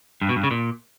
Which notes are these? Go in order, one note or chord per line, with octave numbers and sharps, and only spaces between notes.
G2
B2
G2
C#3
A#2